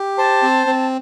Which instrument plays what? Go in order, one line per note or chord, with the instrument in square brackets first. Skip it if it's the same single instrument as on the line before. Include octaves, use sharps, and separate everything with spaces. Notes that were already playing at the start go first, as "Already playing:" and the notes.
Already playing: [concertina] G4
[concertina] C5 [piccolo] A5
[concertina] C4
C4